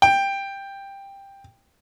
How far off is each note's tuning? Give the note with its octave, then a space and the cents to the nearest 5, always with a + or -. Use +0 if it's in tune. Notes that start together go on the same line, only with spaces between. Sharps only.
G5 +10